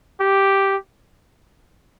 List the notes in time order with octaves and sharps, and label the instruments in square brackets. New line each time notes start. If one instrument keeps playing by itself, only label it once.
[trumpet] G4